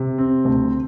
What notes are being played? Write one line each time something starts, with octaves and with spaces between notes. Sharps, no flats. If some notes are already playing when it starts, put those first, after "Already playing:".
Already playing: C3
C4
D2